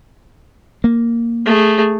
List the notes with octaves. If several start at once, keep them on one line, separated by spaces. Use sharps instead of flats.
A#3
A3 G#4